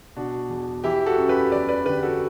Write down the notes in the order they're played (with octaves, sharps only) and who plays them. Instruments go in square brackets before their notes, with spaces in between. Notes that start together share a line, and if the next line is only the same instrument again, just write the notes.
[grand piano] B2 D4 F#4
E2
E3 E4 G4
F#4 A4
F#2
G4 B4
E2 B4 D5
B4 D5
D3 G4 B4
F#4 A4